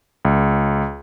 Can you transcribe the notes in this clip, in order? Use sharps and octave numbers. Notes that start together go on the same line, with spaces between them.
C#2